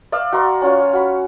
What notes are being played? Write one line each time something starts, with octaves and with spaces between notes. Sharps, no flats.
D5 E5 F5
F#4 F5 A#5 C6
C#4 F4 C#5
F#4 B5